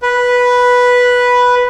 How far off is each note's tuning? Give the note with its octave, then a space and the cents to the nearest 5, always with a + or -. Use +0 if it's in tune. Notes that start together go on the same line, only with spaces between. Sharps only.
B4 -5